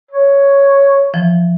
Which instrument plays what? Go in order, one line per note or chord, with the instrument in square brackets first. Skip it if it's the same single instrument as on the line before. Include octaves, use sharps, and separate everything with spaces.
[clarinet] C#5
[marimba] E3 F3